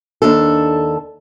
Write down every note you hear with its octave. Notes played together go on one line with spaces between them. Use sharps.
D#2 D4 A4